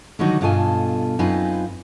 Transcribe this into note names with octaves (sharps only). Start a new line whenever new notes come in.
D3 D#3 F#3 G3 D#4 F#4
G2 B2 F4 A4 D#5 G#5
F#2 C4 D#4 F4 B4 G#5